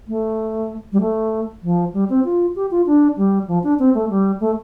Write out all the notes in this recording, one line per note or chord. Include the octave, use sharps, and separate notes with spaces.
A3
G3
A3
F3
G3
C4
F4
G4
F4
D4
G3
F3
D4
C4
A3
G3
A3